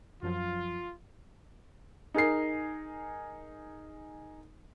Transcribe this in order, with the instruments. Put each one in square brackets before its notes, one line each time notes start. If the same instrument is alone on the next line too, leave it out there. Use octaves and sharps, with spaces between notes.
[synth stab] F#2 F3 F#3 [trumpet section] F4
[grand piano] D#4 G#4 A#4 C7